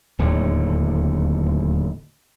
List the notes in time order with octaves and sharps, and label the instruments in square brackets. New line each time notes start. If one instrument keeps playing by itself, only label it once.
[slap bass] D1 D#2 A2 D3